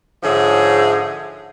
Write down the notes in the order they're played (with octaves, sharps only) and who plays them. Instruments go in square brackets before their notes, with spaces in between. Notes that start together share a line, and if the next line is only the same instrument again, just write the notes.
[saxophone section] G#2 D3 F3 G#4 C#5 E5